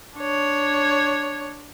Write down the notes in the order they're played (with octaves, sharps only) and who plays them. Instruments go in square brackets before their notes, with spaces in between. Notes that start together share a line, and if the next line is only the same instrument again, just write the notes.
[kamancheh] D4 C#5